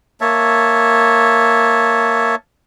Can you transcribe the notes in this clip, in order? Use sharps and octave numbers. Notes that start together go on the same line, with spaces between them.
A#3 C#5 E5 A5